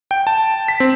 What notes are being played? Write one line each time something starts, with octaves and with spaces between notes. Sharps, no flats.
G5
A5
B6
C4